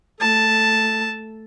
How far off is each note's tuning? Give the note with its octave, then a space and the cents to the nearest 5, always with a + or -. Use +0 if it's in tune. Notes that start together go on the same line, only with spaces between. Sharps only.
A3 +0 A5 +0